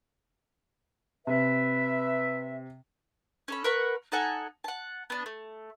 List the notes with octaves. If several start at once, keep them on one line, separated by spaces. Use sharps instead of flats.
C3 B4 E5
C#4 A4 B5
A#4 B4 F#5 C#6
D#4 A4 F#5 G#5
F#5 A5
B3 D4
A3